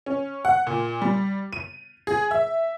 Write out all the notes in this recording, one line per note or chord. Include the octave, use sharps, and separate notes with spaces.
C#4
F#5
A#2
G3
D#7
G#4
E5